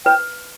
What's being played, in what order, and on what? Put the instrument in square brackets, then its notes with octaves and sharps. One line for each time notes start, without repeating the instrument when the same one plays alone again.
[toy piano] B4 [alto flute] G5